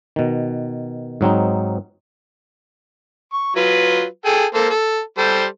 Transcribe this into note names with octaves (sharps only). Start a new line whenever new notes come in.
B2 D#3
G#2 F#3 C4 D#4
C#6
F#3 F4 B4
G#4 A4 G5
A#3 A4 C5
A4
G3 A4 C5